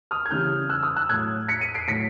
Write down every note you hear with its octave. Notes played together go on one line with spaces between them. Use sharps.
D#6 F6
G#6
C#3 E3 G3 F6 G6
E6 F#6
D#6 F6
E6 F#6
A2 F#3 F#6 G#6
B6 C#7
C#7 D#7
C7 D7
A2 F#3 B6 C#7